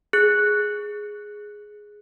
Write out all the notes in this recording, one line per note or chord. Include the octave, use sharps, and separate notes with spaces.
G#4 F#6